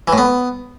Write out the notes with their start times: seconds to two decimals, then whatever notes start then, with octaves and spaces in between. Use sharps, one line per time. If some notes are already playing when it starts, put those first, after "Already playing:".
0.08 E3
0.13 A2
0.18 B3